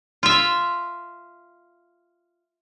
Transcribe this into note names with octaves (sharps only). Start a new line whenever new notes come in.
F4 E5